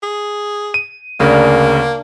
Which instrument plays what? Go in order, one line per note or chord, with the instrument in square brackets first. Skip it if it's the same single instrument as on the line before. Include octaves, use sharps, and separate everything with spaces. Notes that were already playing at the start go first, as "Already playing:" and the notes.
[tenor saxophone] G#4
[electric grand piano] D#7
[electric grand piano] D2 C#3 A#4 [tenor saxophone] A#3 [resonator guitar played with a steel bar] D4